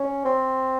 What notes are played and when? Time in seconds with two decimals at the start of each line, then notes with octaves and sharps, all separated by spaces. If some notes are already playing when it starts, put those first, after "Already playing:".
Already playing: C#4
0.25 C4